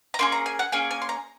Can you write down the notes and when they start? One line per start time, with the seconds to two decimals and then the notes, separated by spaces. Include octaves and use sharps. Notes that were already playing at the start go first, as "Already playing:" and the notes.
0.14 A#5
0.19 A#3 C#4 G#4 C6
0.32 A#5
0.46 G#5
0.59 F#5
0.72 A#3 C#4 G#4 G#5
0.91 G#5
1.02 C6
1.09 A#5